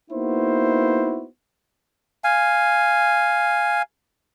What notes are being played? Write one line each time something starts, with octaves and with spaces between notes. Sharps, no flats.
A#3 B3 D#4 E4 F#4 C5
F5 G#5